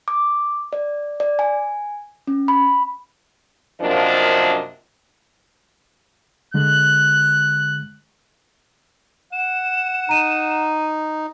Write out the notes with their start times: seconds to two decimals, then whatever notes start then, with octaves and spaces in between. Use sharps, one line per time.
0.08 D6
0.73 D5
1.20 D5
1.39 G#5
2.27 C#4
2.48 B5
3.81 F#2 C3 F3 A#3 D4 D#5
6.54 D3 G#3 F#6
9.32 F#5 E7
10.09 D#4 A#5 D#7